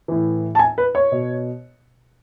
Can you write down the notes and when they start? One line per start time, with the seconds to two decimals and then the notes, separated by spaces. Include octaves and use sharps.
0.08 A2 E3
0.55 A5
0.59 G#5
0.78 B4
0.95 C#5
1.12 B2